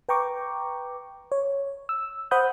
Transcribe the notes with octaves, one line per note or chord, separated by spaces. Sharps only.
B4 G5 A#5 C#6 D6
C#5
E6
C5 F#5 B5 D#6 F#6 G6